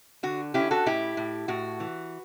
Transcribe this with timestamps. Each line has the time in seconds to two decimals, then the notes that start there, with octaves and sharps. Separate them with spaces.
0.23 D3 F#4
0.54 C#4 E4 G4
0.71 F#4 A4
0.86 A2 E4 G4
1.17 A2
1.48 A2 F#4
1.80 E3